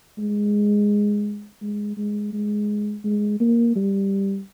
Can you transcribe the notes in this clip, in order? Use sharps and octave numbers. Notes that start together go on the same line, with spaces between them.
G#3
G#3
G#3
G#3
G#3
A#3
G3